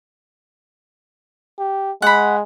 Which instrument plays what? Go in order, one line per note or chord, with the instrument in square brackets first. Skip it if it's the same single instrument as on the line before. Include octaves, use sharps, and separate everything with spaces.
[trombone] G4
[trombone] G#3 [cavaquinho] F#5 B5